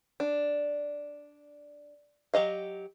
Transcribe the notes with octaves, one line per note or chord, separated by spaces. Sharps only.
D4
F#3 G4 D#5 F5